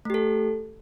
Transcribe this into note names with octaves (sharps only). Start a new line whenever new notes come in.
A3 G4 A4